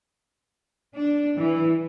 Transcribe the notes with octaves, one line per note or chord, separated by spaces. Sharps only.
D4
E3